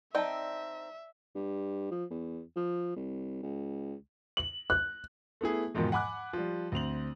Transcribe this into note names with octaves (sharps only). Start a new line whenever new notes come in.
C4 D#4 D5 E5 G5 A5
G2
F3
E2
F3
C2
C#2
F#7
F#6
A3 B3 E4 G#4
E2 G#2 B2 D#3 F3
F#5 G#5 B5 D6 F#6
F3 G3
D2 C4 F7 F#7